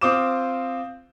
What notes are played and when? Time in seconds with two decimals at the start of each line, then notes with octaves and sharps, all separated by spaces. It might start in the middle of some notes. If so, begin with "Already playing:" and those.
0.01 C4 F4 C5 D6 D#6 E7